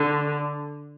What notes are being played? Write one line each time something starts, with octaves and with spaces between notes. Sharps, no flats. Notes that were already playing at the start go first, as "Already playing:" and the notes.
Already playing: D3